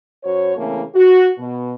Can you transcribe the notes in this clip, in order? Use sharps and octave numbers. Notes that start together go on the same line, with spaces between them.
F#2 F#4 C5 C#5
C#3 E3 A3 A#3 C4 C#4
F#4
B2